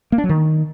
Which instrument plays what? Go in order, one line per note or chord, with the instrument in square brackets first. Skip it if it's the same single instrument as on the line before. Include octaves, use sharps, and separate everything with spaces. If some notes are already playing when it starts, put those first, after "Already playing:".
[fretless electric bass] A#3
D4
F#3
D#3